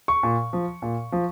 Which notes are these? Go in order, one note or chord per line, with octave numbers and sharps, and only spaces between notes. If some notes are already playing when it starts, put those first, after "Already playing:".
C#6
A#2
F3
A#2
F3